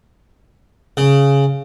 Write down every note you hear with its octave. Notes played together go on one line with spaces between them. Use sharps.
C#3